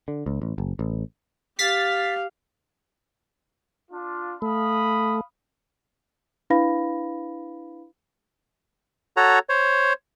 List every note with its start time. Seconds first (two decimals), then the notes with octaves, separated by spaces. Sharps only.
0.08 D3
0.26 C#2
0.42 A1
0.58 F#1
0.79 A1
1.59 G4 F5 A6 B6 C7
3.91 D4 F4
4.42 A3 F5 B5 D#6
6.50 D4 E4 B4 F5 B5 A#6
9.17 F#4 A4 C#5 A#5
9.49 C5 C#5